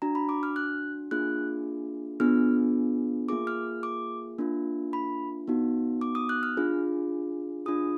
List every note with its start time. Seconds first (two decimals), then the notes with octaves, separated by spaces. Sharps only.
0.02 D4 F#4 A#5
0.15 B5
0.29 D6
0.43 F6
0.56 F#6
1.11 A#3 D4 F4 G#4 F#6
2.20 B3 D4 F4 G#4 F6
3.29 A#3 F4 G#4 D6
3.47 F6
3.83 D6
4.38 A#3 D4 F4
4.93 B5
5.47 B3 D#4 F#4
6.01 D6
6.15 D#6
6.29 F#6
6.43 F6
6.57 D4 F4 G#4
7.66 D4 F4 G#4 D#6